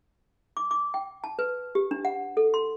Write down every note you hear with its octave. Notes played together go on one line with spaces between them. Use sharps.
D6
D6
G5
A5
B4
G4
D4
F#5
A4
C6